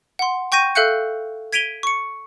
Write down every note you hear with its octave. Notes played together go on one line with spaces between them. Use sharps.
F#5 C6
G5 C#6 G6 A#6 D#7
A4 E5 F5 F#6 G6 C#7
G#6 B6 D7 D#7 F7 G7
C#6 C#7